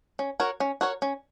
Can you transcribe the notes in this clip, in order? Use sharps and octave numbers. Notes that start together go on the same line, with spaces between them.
C#4
F#4 A#4 C#5
C#4
F#4 A#4 C#5
C#4